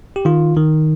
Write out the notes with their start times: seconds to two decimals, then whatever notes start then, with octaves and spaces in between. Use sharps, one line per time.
0.16 G4
0.25 D#3 F4
0.57 D#3